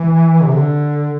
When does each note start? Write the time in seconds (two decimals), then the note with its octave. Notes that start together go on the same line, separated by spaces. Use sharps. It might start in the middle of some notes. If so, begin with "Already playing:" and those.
Already playing: E3
0.43 C3
0.53 D3